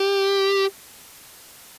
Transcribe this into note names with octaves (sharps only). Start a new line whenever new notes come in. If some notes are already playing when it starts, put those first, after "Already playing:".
Already playing: G4